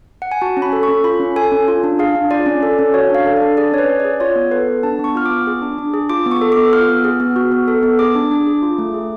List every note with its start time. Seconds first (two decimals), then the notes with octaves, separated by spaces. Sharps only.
0.22 F#5
0.32 G#5
0.42 F#4 A5
0.57 C#4
0.62 B5
0.73 A4
0.83 C#6
0.89 C#4
1.04 F4 B5
1.20 C#4
1.36 A4 G#5
1.52 C#4
1.68 F4
1.84 D4
1.99 G#4 F5
2.16 D4
2.31 F4 D5
2.46 C#4
2.63 A4
2.79 C#4
2.94 F#4 C#5
3.10 D4 F5
3.26 A4
3.36 D5
3.42 D4
3.57 G#4 D5
3.72 C#4 C#5
3.78 B4
3.89 C#4
4.00 D5
4.05 G#4
4.20 F4 C#5
4.36 B3
4.51 A4 B4
4.68 B3
4.83 D4 A5
4.99 B3
5.04 C#6
5.15 F4 F6
5.26 D6
5.31 B3
5.47 G#4
5.62 D4
5.78 D4
5.94 G#4
6.10 F4 D6
6.26 B3
6.31 C#6
6.42 A4
6.52 B3 D6
6.73 F4 F6
6.89 B3
7.05 G#4
7.20 B3
7.36 F#4
7.51 B3
7.68 A4
7.83 B3
7.99 G#4 D6
8.15 D4
8.31 D4
8.46 G#4
8.63 F4
8.78 A3
8.94 G#4